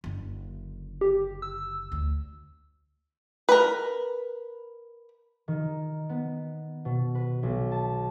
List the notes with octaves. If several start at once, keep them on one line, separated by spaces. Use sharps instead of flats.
F#1 D3
G4
E6
D2
A#4 B4
D#3
B3
B2
B4
B1
A5